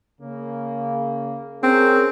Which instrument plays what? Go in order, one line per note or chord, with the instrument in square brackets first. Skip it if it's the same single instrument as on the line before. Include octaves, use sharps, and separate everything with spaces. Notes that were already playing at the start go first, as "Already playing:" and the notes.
[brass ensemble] C#3 A#3
[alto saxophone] C4 [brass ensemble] C#4 G#4 A#4